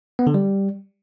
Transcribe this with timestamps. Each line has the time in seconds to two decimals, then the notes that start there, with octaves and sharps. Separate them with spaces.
0.19 B3
0.27 D3
0.34 G3